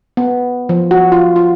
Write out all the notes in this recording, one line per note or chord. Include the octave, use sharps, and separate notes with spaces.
B3
F3
F#4
F4
F4